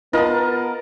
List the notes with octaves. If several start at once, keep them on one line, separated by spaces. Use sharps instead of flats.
B3 F4 A#4 B4 D#5 A5